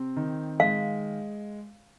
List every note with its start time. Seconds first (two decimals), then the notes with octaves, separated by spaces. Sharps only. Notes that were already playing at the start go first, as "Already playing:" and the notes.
Already playing: C3 C4
0.16 D#3
0.59 G#3 F5